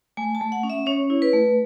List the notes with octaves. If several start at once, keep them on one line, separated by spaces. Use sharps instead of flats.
A3 G#5
A5
A3
F#5
C#4
E5
C#4 C#5
E4
B4
A3